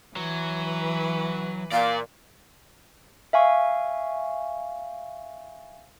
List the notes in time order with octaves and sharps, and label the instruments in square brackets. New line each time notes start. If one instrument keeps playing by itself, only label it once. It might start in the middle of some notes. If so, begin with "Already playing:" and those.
[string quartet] E3 B4 [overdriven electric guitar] F#3
[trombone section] A#2 [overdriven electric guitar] D5 [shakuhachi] F5
[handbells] E5 F5 G#5 C#6